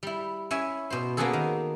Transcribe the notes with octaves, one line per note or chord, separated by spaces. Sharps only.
G3 E4
C#4 E4 C#5 E5 G#5
B2 C5
A#3 B3 C#4 F#4 G#4 A4
D#3